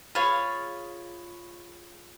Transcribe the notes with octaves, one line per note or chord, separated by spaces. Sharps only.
F4 G#4 C#5 F5 B5